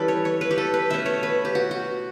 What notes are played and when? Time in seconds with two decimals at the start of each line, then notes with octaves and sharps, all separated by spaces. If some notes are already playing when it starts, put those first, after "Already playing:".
Already playing: E3 G3 C#4 G4 A4 B4
0.08 C#5
0.25 C#5
0.41 B4
0.51 G4
0.58 A4
0.74 B4
0.90 B2 A3 C#4 E5
1.06 C#5
1.23 B4
1.45 G4
1.55 F#4
1.71 F#4